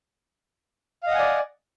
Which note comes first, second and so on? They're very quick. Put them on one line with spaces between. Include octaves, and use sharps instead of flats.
F5 D#5 F#5 G#5 D5